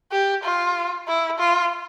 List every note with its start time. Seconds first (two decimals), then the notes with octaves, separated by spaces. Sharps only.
0.12 G4
0.44 F4
1.08 E4
1.39 F4